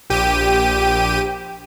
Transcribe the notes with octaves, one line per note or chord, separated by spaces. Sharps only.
A#1 G4 D#7